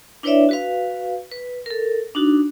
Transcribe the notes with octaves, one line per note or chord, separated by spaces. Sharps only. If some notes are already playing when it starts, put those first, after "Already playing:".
D4 E4 B4 C#5 D5 E5
F#4 B4 F5
B4
A4 A#4
D4 D#4 F#4